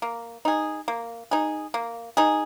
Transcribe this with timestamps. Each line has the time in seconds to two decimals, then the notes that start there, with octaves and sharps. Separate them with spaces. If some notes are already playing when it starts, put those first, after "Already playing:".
0.02 A#3
0.45 D#4 G#4
0.88 A#3
1.31 D#4 G#4
1.74 A#3
2.17 D#4 G#4